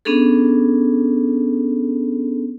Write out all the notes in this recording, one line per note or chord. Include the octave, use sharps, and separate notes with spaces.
B3 C#4 D4 G#4 A4